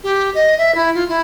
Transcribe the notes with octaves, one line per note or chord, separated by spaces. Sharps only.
G4
D#5
E5
E4
F4
E4